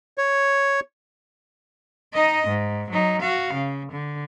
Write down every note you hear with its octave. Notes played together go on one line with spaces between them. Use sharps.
C#5
D#4 D#5
G#2
F#3 D#4
F#4 F5
C#3
D3